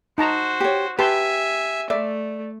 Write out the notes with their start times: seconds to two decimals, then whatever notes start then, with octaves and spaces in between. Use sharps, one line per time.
0.18 D#4 F#4 C5 A5 A#5
0.60 G4 C#5
0.99 G4 B4 E5 G#5 A5 C6
1.90 A3 D5 E5